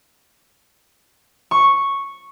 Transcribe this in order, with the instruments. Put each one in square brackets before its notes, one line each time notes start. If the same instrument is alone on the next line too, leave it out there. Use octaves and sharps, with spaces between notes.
[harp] C#6